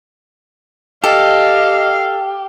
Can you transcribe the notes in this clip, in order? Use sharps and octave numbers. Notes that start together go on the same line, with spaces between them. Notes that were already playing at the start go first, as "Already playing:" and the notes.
G4 A4 D#5 F5 A5